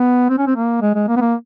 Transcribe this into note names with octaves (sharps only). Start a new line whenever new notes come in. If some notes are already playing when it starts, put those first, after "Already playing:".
Already playing: B3
C4
C#4
C4
A#3
G#3
G#3
A#3
B3
A#3